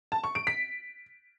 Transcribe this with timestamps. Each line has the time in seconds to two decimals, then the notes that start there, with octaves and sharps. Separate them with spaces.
0.12 A5
0.24 C#6
0.35 D7
0.47 B6